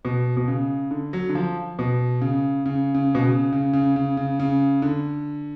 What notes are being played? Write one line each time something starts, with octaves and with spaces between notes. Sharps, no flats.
B2
B2
C#3
D3
F#3
D3
F3
B2
C#3
C#3
C#3
B2
C#3
C#3
C#3
C#3
C#3
C#3
D3